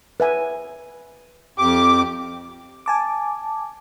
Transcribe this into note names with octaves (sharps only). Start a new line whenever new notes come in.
B4 E5 G#5
F2 G4 D6
G#5 A5 D6